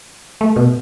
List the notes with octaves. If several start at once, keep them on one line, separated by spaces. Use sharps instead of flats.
A3
B2